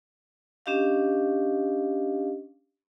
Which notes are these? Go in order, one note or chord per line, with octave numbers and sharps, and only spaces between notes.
C#4 D4 G4 D#5 F5